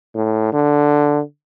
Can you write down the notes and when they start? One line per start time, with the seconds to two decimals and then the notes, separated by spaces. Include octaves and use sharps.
0.15 A2
0.53 D3